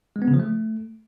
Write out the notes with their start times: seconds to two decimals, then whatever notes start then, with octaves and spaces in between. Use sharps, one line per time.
0.16 G#3
0.22 B3
0.28 C#3
0.34 F3
0.40 A3